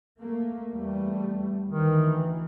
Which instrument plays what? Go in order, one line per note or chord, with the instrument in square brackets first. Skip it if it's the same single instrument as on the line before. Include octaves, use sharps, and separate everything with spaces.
[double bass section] A3 A#3
E2 G3 A3
[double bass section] D2 E3 [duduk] D#3